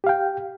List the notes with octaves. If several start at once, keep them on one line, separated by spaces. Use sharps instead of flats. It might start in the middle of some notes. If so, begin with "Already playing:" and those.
G4 F5 G5